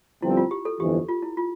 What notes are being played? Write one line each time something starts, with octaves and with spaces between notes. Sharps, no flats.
G1 G2 F3 C4 E4
F4
G4
A4
G1 F2 E3 G4
F4
E4
F4